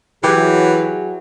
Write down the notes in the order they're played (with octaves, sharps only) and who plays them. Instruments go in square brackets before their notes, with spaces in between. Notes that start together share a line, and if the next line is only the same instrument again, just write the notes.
[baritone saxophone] E3 [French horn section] F#3 G#4 [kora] E4 G4 B4